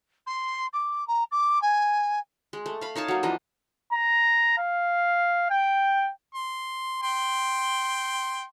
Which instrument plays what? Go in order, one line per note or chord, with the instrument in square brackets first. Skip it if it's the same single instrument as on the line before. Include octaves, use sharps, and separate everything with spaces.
[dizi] C6
D6
A#5
D6
G#5
[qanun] G#3
A3
F5 B5
D#4 C#5 F5 A5
F#3 A#3
E3 F3 D4 D#5
[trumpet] A#5
F5
G5
[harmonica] C6
G5 C6